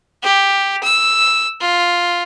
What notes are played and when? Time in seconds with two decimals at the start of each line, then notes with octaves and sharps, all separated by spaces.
0.23 G4
0.83 E6
1.60 F4